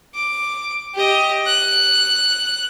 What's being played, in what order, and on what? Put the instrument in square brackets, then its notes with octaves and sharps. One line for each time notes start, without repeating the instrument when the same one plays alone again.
[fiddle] D6
G4 D#5
F#6